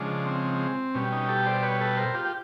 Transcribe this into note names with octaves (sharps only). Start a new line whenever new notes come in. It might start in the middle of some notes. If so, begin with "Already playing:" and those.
Already playing: C#3 F3 G#3 D4
C4
B2 G3 C#4
C#4 D#4
G4 A4
C5 D5
B4 C#5
A4 B4
A#4 C5
F4 G4
G4